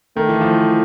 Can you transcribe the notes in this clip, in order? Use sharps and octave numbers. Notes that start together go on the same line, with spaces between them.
D#3 A3
E3
F3